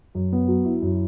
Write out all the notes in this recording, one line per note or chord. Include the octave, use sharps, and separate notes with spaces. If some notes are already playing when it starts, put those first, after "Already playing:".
F#2
B3
F#3
E4
F#2